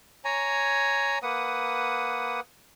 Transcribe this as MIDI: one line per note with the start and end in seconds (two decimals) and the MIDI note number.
0.25 1.19 73
0.25 1.19 80
0.25 1.19 82
1.23 2.40 58
1.23 2.40 71
1.23 2.40 78
1.23 2.40 87